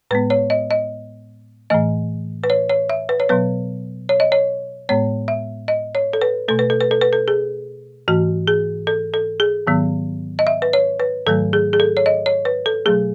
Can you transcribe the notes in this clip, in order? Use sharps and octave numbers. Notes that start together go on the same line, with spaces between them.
A2 G#3 B3 B4
C#5
D#5
D#5
A2 E3 A3 D#5
B4
C#5
C#5
E5
B4
C#5
B2 F#3 B3 B4
C#5
D#5
C#5
A2 G#3 B3 C#5
E5
D#5
C#5
A4
B4
B2 A3 A4
B4
A4
B4
A4
B4
A4
G#4
G#2 E3 A3 F#4
G#4
A4
A4
G#4
G#2 D#3 F#3 B3
D#5
E5
B4
C#5
B4
G#2 D#3 F#3 A3 A4
G#4
G#4
A4
C#5
D#5
C#5
B4
A4
B2 F#3 A3 G#4